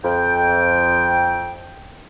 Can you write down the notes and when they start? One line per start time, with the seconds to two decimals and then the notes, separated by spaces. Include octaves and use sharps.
0.04 F2 G5